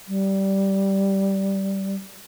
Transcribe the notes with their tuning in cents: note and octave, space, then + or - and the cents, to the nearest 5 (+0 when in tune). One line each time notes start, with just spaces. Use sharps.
G3 -15